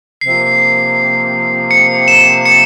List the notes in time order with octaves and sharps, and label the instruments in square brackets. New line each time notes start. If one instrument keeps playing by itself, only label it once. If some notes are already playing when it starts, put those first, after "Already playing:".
[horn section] C3 F3 A#3 [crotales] C7
[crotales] C#7
E7
C#7